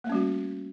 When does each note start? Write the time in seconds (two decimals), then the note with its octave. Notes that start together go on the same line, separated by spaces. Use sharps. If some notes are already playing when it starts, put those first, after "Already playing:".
0.04 A#3
0.07 A3
0.09 C#4
0.12 G3
0.15 F#4